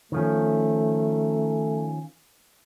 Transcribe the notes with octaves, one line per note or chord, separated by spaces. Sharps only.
D#3 F3 A3 C#4